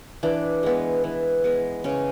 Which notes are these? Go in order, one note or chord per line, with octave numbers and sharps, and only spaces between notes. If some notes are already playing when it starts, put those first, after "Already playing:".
E3 D4
G#3 B3
E3
G#3 B3
C#3 C#4